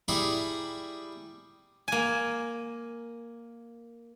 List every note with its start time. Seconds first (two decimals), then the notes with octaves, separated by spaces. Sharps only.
0.08 G3 E4 G#4 A#5 B5 D#6
1.88 A#3 G#5